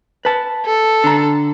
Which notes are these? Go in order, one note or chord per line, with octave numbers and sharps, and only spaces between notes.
B4 A5
A4
D3 A#5